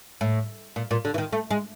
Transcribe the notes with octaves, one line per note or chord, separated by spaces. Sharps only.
A2
A#2
A#2
D3
E3
D#3
A3
G#3